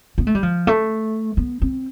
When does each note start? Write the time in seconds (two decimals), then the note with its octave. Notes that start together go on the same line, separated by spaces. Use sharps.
0.18 B3
0.27 A3
0.35 G3
0.43 F3
0.67 A3
1.37 B3
1.62 C4